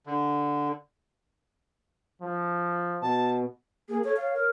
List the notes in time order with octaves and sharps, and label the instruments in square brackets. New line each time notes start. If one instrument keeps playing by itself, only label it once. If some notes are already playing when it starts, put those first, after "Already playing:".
[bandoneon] D3
[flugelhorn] F3
[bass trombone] B2 [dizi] A5
[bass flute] A#3 [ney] G#4
[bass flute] A4 [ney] C#5
[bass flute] C#5 [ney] F5
[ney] A#4